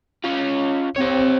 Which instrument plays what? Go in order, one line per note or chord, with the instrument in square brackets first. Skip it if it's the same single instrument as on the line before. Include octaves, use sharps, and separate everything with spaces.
[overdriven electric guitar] C#4 F4
[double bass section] C4 [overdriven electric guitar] G4 C#5